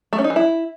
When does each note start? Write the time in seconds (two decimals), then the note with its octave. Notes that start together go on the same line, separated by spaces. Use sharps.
0.13 A3
0.18 C#4
0.24 D#4
0.30 E3
0.36 E4